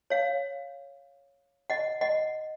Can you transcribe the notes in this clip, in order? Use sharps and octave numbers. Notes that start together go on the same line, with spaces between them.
C#5 F5
D#5 F#5
D#5 F#5